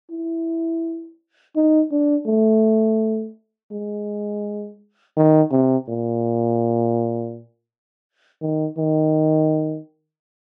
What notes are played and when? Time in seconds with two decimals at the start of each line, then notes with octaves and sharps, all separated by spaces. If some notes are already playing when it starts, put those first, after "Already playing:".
0.11 E4
1.56 D#4
1.91 D4
2.27 A3
3.72 G#3
5.17 D#3
5.52 C3
5.89 A#2
8.42 D#3
8.78 D#3